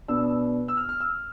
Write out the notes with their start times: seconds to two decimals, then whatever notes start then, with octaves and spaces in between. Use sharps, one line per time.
0.08 B2 B3 D4 E6
0.68 E6
0.77 F6
0.89 F6
1.01 E6